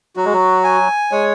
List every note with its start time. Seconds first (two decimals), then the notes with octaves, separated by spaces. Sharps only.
0.17 F#3 F#4
0.25 G#3
0.33 F#3
0.64 G#5
1.11 G#3 C#5